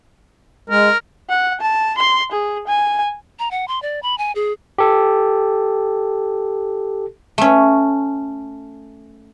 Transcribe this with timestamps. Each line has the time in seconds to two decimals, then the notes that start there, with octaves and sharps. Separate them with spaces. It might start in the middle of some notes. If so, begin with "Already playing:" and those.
0.70 G#3 A#4
1.29 F#5
1.61 A5
1.98 C6
2.32 G#4
2.67 G#5
3.39 A#5
3.51 F#5
3.68 C6
3.82 D5
4.03 B5
4.18 G#5
4.35 G#4
4.78 G4 A4
7.38 A3 C#4